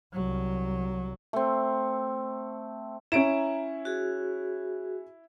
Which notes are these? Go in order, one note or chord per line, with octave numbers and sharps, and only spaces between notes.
C2 F#3
A3 C4
C#4 E4 A#5 D7 E7
F#4 G#4